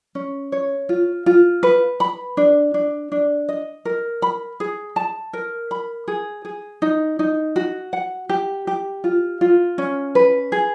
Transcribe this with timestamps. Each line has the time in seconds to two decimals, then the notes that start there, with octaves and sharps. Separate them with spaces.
0.15 C#4
0.52 C#5
0.89 F4
1.26 F4
1.63 B4
2.00 B5
2.37 D4
2.74 D4
3.12 D4
3.49 D#5
3.85 A#4
4.22 B5
4.60 G#4
4.96 A5
5.33 A#4
5.71 B5
6.08 G#4
6.45 G#4
6.82 D#4
7.19 D#4
7.56 F#4
7.93 F#5
8.29 G4
8.67 G4
9.04 F4
9.41 F4
9.78 C#4
10.15 B4
10.52 G#4